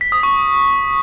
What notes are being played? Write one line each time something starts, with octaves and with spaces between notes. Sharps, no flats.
B6
D#6
C#6